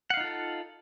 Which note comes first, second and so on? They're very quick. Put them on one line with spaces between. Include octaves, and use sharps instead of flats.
F#5 F5 D#4 F4 A4